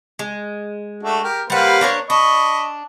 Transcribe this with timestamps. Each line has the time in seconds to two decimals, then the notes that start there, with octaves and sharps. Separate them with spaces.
0.19 G#3
1.03 A3 D4 F#4
1.24 G4 A#4
1.50 G3 A#3 B4 C5 F#5
1.81 D4 A#4 C#5
2.10 D4 D#5 B5 C#6